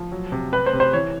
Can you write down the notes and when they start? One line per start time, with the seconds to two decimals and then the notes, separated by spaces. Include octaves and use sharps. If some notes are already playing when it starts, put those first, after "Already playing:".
Already playing: F3
0.12 F#3
0.32 C3
0.53 C3 B4
0.66 C5
0.73 C3
0.80 C5
0.93 E3 C#5